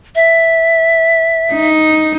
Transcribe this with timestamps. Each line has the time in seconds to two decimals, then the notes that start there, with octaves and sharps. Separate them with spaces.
0.15 E5
1.52 D#4